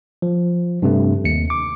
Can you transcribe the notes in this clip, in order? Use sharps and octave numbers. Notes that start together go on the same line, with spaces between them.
F3
G2 C3 A3
D#2 C#7
D6